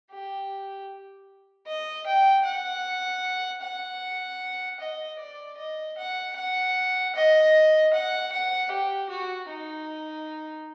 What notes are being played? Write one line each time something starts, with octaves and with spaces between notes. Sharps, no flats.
G4
D#5
G5
F#5
F#5
D#5
D5
D#5
F#5
F#5
D#5
F#5
F#5
G4
F#4
D#4